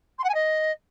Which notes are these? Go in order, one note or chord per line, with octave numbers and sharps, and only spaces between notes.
C6
F#5
G#5
D#5